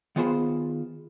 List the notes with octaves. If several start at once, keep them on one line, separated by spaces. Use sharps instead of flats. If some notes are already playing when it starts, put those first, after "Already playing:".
D#3 B3 F4 G#4 C5 B5